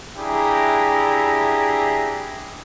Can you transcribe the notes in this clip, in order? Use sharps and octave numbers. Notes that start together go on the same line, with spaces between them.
D4 E4 G4 G#4 E5 A#5